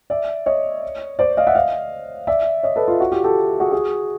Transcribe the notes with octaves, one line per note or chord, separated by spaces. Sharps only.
D5 E5
C#5 D#5
C5 D5
D#5 F5
E5 F#5
D#5 F5
D5 E5
C#5 D#5
A4 B4
F4
F#4
F4 G4
G4 A4
F#4 G#4
F#4 G#4